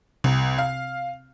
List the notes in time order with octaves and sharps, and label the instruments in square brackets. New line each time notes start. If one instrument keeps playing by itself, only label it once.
[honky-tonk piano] C2 [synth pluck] C3
[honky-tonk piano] F5